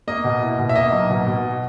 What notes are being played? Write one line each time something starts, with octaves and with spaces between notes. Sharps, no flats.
A#3 D#5
B2
E4
B2
E5
A#3 D#5
B1
B2
B2